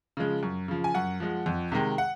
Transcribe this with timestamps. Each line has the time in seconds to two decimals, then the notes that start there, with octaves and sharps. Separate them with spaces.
0.17 C#3 F3 G#3
0.43 F#2
0.68 C#3 F3
0.84 G#5
0.94 F#2 F#5
1.20 F3 G#3
1.46 F2
1.72 C3 D#3 G#3
1.98 F#5